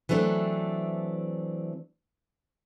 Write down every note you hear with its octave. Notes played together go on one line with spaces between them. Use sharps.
E3 F#3 A3 C4 D4